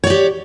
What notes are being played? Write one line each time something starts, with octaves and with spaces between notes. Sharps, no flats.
G4 C#5 D5